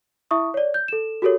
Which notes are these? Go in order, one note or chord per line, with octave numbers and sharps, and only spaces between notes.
E4 E5 C#6 D#6
C#5 D5
G6
A4 E7
F#4 G4 A4 A#4 C#5